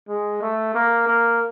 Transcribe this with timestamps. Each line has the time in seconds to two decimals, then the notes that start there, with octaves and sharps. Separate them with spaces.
0.08 G#3
0.41 A3
0.75 A#3
1.07 A#3